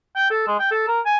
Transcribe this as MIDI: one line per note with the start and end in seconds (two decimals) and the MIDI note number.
0.16 0.30 79
0.30 0.42 69
0.47 0.57 56
0.59 0.71 79
0.71 0.87 69
0.88 1.00 70
1.06 1.18 80